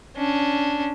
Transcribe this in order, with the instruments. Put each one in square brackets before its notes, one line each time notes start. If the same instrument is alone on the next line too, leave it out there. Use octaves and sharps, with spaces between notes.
[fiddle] C#4 D4